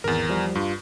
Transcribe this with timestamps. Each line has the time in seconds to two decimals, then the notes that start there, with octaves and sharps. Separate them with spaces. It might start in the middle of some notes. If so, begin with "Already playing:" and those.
0.04 G#1 E2 A#4 A6
0.29 F3 G3
0.55 G2 F4